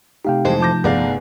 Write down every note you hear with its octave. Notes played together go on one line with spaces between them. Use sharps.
C3 A3 D#4 G4 F5 G5
F2 E3 G#3 C5
F3 A5 D6 G6 A#6
G1 B3 G#4 D5 F5